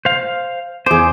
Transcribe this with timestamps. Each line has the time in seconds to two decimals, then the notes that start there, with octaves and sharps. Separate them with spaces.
0.05 C5 F5
0.86 E2 G#4 C5 D6